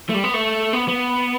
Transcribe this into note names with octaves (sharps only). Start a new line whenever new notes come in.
A3
G3
B3
A3
B3
B3